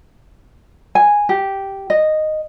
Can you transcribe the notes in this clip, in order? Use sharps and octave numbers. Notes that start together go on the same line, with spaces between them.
G#5
G4
D#5